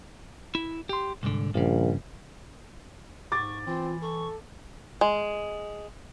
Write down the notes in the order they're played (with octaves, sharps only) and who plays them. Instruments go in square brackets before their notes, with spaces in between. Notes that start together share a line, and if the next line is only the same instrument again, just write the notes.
[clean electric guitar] E4
G4 C6
C2 G#2 D3
[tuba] A#1 [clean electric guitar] G2 C#3
[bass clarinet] G#2 [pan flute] C#6 [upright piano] D6 A6
[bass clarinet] E3 [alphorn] C4 [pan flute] F4
[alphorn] A4 [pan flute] C#6
[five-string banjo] G#3